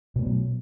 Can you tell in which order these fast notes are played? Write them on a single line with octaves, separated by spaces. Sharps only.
B2 A3 B3 F#3